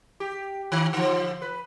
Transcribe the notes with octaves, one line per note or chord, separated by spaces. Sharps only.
G4
D#3
D3 F3
B4